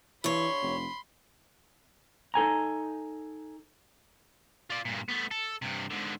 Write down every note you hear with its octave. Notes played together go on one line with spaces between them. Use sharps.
G2 E3 C#5 B5 C6
F1
D#4 A4 G#5 A#5
F4 D5
G2 A#2
A3 B3
A4
G2 C3
G#2 D3